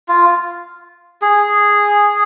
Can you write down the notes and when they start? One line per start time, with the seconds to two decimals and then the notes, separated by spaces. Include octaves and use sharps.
0.08 F4
1.22 G#4